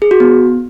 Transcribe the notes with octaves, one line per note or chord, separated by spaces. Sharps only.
G#4
F#4
B3